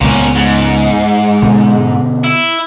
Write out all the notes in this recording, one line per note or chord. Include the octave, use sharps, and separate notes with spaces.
C#2 A#2 B3 C#4
G#2
B2 D3
E4